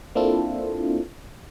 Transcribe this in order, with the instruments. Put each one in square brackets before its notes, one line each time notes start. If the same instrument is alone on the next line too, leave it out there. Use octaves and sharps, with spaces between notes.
[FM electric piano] A#3 C4 D4 E4 F4 A4